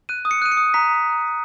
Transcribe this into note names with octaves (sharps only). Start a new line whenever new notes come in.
F#6 D#7
D#6
C#7
F#6 D#7
C#7
D#6
A#5 B6